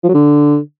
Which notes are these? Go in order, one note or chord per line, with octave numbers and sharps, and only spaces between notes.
F3
F#3
D3